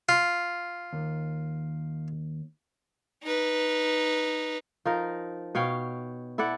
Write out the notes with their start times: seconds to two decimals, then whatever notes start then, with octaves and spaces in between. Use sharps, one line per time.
0.09 F4
0.93 D#2
3.23 D#4 B4
4.85 F3 D#4 A#4
5.55 B2 C#5 F5 G5
6.38 E4 A4 D5 F#5